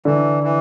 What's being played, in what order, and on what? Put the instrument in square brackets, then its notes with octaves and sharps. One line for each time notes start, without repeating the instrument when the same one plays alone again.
[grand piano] D3 [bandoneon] E3
[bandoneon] E3